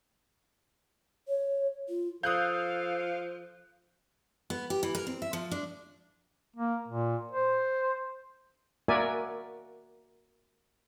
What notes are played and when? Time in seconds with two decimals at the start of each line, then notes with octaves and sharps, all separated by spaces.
1.28 C#5
1.89 F4
2.23 F3 A4 F5 D#6 F#6 G6
4.50 B3
4.70 G4
4.83 E3
4.95 A#4
5.07 C4
5.22 E5
5.33 F3
5.51 D4
6.56 A#3
6.88 A#2
7.32 C5
8.88 A#3 F#4 A#4 D5 E5 G#5